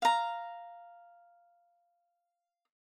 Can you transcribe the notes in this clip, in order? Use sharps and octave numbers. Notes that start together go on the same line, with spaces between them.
F5 A#5